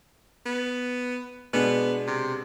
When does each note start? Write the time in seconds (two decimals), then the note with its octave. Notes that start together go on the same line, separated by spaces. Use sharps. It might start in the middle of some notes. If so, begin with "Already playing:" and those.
0.46 B3
1.53 B2 G#3 B3 D4
2.07 C3